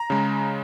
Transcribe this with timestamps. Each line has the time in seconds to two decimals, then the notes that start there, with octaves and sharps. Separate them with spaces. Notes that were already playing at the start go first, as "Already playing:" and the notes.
Already playing: A#5
0.10 C#3 G#3